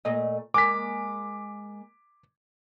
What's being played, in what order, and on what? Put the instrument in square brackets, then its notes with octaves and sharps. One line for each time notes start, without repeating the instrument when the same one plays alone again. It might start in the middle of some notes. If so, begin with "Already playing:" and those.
[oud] A#2 A3 D#5
[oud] G#3 A#3 [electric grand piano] D6 B6